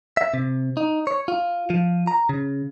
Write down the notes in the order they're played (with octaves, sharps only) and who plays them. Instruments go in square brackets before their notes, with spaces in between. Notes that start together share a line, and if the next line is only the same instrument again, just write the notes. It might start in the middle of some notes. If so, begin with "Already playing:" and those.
[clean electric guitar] E5
C3
D#4
C#5
F4
F3
A#5
C#3